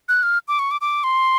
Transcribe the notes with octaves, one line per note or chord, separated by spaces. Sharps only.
F#6
F6
D6
C#6
D6
D6
C6